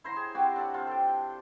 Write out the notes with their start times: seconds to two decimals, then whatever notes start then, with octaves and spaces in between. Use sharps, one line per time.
0.04 E4 C5 A#5 C6
0.16 G#4
0.35 C4 F#4 G4
0.56 D4 A4 F#5
0.74 C3 F4
0.87 A4 G5